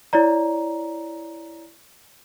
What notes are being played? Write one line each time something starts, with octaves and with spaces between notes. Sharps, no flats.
E4 C#5 D5 A#5